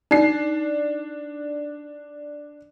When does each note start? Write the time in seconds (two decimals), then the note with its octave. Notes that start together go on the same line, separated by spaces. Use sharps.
0.11 D4 D#4 C7